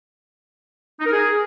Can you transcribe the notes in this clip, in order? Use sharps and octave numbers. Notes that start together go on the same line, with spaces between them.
D#4
A#4
G#4